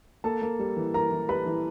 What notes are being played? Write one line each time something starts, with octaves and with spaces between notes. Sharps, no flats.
A#3 A4 A5
A#3
G3
E3
E3 A#4 A#5
E3
G3 B4 B5
E3